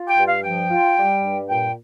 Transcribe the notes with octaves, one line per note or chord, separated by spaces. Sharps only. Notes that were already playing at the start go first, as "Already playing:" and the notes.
Already playing: F4
G5
G2
F5
F3 G5
F4
G3
G2
A#2 G5